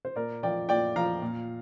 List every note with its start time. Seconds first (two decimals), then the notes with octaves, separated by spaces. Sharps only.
0.05 C5
0.16 A#2 A#4 D5
0.43 F3 D5 G5
0.69 A#2 D5 G5
0.96 F3 F5 A#5
1.22 A#2